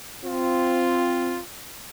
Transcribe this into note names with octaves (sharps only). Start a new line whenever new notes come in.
C4 F4